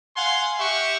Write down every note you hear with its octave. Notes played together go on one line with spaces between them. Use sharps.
F5 F#5 G#5 C6
G4 E5 F#5 C#6